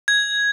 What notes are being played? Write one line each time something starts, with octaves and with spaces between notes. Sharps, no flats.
G#6